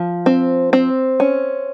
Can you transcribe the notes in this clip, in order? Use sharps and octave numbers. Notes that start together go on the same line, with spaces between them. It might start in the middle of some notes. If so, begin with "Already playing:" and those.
Already playing: F3
C4
C4
C#4